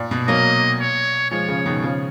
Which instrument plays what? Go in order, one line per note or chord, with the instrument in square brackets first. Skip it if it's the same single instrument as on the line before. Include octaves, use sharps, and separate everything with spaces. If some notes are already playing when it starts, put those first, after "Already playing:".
Already playing: [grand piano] A#2
B2
[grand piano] F#3 A#3 [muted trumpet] D#5
[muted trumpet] C#5
[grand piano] F3 G#3 [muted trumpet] C#5
[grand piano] C#3 F3
B2 D#3
C#3 F3